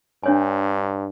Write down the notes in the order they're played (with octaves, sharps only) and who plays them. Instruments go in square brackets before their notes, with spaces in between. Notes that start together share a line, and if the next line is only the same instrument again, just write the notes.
[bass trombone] G2 [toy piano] D4 C#5 G#5